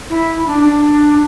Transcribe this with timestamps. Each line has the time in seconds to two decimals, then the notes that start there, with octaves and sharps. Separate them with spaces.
0.10 E4
0.46 D4
0.65 D4